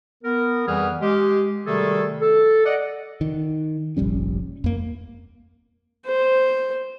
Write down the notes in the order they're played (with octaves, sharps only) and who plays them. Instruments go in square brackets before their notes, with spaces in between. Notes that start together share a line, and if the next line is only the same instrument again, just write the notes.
[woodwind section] B3 A#4
F2 E3 G3 G#4 F#5 F6
G#3 G4
C3 D#3 G3 A3 G#4 A4
A4
D5 D#5 F#5
[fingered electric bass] D#3
F1 A#1 G3 C#4
F2 A#3
[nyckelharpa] C5